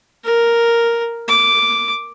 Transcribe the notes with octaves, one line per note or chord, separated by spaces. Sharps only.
A#4
D6